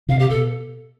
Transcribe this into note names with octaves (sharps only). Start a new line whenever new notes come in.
C3 F5
G4
B2 A4